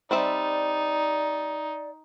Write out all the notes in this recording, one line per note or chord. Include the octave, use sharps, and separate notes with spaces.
G3 C4 D#4 D5 E5